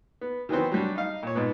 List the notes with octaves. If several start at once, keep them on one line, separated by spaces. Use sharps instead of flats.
B3
D#3 E3 F#3 B3 C4
F#3 G3 D4
D#4 F5
A#2 C#5
G#2 B2 B3